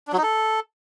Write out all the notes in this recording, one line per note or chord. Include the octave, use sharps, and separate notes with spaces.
D4
F#3
D#4
A4